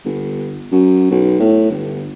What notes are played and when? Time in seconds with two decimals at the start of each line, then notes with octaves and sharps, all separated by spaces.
0.06 G1
0.72 F#2
1.11 B1
1.40 A2
1.70 G1